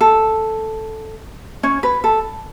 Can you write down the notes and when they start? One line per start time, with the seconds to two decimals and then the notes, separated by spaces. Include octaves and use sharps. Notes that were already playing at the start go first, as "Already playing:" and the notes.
0.01 A4
1.63 C#4 C#5
1.83 B4
2.04 A4